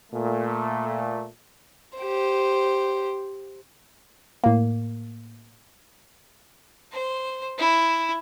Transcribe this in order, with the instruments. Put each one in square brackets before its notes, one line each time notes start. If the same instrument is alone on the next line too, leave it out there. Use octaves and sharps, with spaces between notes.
[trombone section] A#2 A3
[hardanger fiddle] G4 C5
[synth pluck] A2 A#3
[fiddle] C5
E4